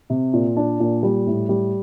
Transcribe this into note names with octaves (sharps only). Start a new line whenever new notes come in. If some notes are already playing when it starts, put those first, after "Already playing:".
C3
A#2
D4
A#2
G3
A2
G3